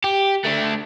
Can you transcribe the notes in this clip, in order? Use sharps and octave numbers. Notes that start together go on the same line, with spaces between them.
G4
A3 D4